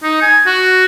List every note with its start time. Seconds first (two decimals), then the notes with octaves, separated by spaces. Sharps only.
0.03 D#4
0.22 G#5
0.46 F#4